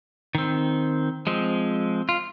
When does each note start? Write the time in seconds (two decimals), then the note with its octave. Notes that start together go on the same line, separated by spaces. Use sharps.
0.35 D#3 C4
1.27 F3 G#3 C4
2.09 F4